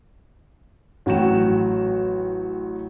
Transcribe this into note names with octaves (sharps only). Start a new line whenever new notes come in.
A1 F#3 F#4 G5 E7